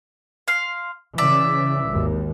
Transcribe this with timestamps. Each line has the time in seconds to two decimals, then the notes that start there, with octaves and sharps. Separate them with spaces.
0.48 F5 C6
1.18 C#3 E3 D5 E5
1.88 G#1 D#2